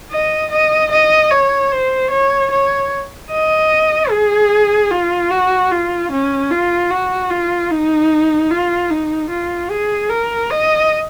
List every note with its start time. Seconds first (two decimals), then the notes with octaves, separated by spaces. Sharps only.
0.11 D#5
0.51 D#5
0.91 D#5
1.31 C#5
1.72 C5
2.11 C#5
2.51 C#5
3.31 D#5
4.11 G#4
4.91 F4
5.31 F#4
5.71 F4
6.11 C#4
6.51 F4
6.90 F#4
7.30 F4
7.71 D#4
8.50 F4
8.90 D#4
9.30 F4
9.70 G#4
10.09 A#4
10.51 D#5